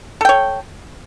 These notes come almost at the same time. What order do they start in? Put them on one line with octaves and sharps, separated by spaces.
A4 G5 C#5